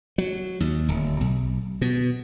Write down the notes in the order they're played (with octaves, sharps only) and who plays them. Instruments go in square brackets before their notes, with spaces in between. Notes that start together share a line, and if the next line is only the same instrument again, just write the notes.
[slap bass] F#3
D#2
D1
B1
B2